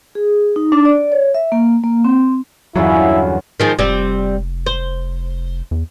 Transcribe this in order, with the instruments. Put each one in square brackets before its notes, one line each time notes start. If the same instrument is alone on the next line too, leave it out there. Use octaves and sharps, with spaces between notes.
[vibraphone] G#4
D#4
D4
D5
C#5
E5
A#3
A#3
C4
[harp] G1 E2 F4 [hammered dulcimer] C#3 C#4 B5 [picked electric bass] F#3 [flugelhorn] E4
[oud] D#3 F3 G#3
[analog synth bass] F1 [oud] G3 C4
[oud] C5
[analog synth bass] E2